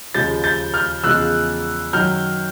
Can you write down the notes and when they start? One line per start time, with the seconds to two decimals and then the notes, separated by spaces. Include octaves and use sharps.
0.14 D#2 C#3 F3 G#3 G6 A6
0.44 G6 A6
0.74 F6 G6
1.04 E2 C#3 F3 G#3 E6 F#6
1.93 F#2 D#3 F#3 F6 G6